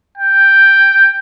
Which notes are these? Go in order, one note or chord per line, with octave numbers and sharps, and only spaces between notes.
G5